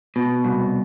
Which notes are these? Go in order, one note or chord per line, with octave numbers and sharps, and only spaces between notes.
B2
C2